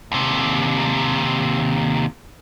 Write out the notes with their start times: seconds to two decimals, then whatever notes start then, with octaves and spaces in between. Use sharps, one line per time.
0.12 D#2 C3